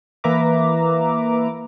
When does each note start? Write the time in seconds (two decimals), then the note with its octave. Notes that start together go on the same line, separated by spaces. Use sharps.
0.24 E3 A#3 B4 E5 A#5 D6